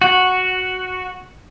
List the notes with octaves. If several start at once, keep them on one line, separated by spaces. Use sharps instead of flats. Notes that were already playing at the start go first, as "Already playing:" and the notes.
F#4